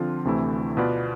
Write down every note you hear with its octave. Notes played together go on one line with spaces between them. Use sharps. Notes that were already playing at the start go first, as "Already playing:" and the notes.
Already playing: D3 F3 C4 F4
D2 C3 E3 A3 E4
B2 B3 F4 B4 D5